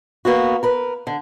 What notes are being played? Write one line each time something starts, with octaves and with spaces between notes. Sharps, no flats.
A#3 B3 F#4
A#4 B4
D3